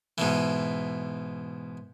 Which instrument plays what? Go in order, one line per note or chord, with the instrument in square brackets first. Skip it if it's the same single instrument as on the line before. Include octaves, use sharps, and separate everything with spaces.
[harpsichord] G#2 B2 E3